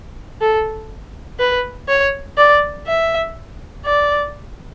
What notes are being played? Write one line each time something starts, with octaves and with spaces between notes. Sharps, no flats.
A4
B4
C#5
D5
E5
D5